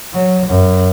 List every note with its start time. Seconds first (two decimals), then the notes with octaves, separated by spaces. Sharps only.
0.14 F#3
0.47 F#2